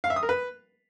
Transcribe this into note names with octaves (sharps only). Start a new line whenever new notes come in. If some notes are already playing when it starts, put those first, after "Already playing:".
F5
E5
D#6
A#4
B4